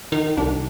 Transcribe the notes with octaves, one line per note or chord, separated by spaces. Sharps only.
D#3 D#4
C2 D4